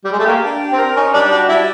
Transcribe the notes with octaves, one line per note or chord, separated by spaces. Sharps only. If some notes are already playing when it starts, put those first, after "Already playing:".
G3
G#3
A3
A#3 G4
D4
G4
C4
A#4
C#4 D#4
G3 D4
D4 F#4
G3 E4